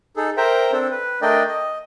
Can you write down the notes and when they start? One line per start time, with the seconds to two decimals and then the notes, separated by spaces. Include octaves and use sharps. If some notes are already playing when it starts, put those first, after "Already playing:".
0.17 D#4 G#4 A4
0.37 A#4 C5 E5 G5 A#5
0.72 C4 D4 A4
0.91 B4
1.22 A3 D4 A#4 D5 D#5 G5
1.48 D#5